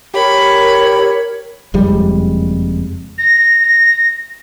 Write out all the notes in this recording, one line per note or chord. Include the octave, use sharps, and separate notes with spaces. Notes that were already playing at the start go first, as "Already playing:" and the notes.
G4 A#4 C#5 B5
F#1 F2 G3 G#3
A#6